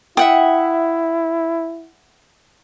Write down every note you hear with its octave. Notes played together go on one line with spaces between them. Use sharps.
E4 E5 F#5 G5 D#6